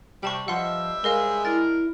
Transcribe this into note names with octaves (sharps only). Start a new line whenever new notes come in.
C3 G3 G5 A5 C#6
G2 F3 G3 D#5 E5 F#5 C6
G#3 A#4 C5 D#5 F5
D4 E4 A#4 A6